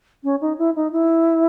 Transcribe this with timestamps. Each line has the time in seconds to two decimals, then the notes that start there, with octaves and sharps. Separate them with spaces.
0.24 C#4
0.41 D#4
0.58 E4
0.76 D#4
0.92 E4